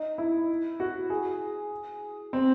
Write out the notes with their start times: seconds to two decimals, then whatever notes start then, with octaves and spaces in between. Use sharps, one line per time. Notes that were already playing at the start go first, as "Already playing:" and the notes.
Already playing: D#4
0.18 E4
0.80 F#4
1.10 G#4
2.33 C4